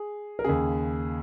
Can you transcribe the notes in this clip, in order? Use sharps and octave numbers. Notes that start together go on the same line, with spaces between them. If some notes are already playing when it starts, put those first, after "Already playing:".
Already playing: G#4
A#4
D#2 C#3 G#4